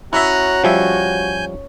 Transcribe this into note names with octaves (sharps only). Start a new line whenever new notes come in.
C#4 E4 F#4 E5 A#5 F#6
F3 G3 E5 G#5 G6